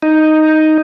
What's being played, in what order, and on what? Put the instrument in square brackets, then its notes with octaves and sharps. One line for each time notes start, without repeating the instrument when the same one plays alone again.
[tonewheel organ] D#4